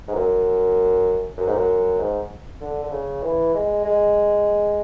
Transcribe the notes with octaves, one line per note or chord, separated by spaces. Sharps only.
G#2
F#2
F#2
G#2
F#2
G#2
D3
D3
C#3
E3
G#3
G#3